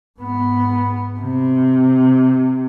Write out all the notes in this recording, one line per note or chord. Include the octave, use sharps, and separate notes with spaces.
G#2 B3
C3